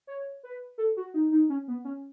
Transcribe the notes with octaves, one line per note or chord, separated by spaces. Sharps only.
C#5
B4
A4
F#4
D#4
D#4
C#4
B3
C#4